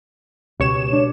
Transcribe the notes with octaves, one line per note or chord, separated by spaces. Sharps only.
C#2 B2 G4 C#5 E7
D4